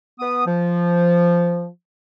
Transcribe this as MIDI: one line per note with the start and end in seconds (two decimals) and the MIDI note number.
0.19 0.43 59
0.19 0.43 87
0.46 1.67 53